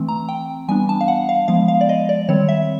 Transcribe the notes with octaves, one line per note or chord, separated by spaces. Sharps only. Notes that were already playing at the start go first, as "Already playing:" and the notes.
Already playing: E3 A3 C4
A#5
G5
E3 G3 B3 D4 G#5
A5
F5
F#5
F5
F3 G#3 B3 F5
F5
D5
D#5
D5
D#3 G3 C4 C#5
E5